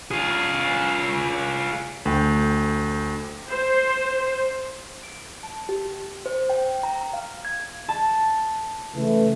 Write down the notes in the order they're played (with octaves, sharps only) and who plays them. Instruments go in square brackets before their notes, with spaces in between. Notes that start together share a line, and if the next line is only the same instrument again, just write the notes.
[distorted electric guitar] F4 G#4
[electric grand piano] D2 G5
[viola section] C5
[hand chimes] D7
A5
G4
C5
G5
A#5
F5
G#6
[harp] A5
[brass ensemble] C#3 E3 A3